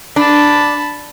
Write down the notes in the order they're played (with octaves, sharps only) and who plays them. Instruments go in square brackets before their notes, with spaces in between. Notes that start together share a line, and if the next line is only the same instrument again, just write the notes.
[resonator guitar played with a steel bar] D4 [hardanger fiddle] A5 B5